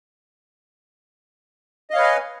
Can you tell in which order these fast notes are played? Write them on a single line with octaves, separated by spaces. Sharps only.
D#5 F5 C#5 B4 G#5